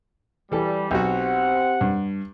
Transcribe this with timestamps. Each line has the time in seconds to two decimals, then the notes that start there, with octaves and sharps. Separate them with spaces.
0.52 E3 G3 A4
0.91 B1 C4 F#4 G4 F#5
1.81 G2